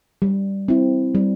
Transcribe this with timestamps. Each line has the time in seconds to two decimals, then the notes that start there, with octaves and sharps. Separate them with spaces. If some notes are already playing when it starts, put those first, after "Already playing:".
0.22 G3
0.68 C4 E4
1.15 G3